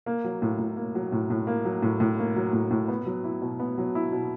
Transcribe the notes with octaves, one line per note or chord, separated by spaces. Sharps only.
A#3
F#3
A2
A2
A#3
F#3
A2
A2
A#3
F#3
A2
A2
A#3
F#3
A2
A2
B3
F#3
E4
B2
B3
F#3
E4
B2